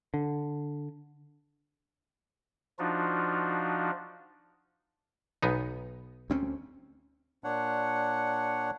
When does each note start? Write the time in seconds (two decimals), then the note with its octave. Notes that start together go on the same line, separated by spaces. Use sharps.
0.14 D3
2.79 F3 D4 D#4 F4 F#4
5.43 B1 B3 D#4
6.30 D2 C4 C#4
7.44 A#2 D4 C#5 F#5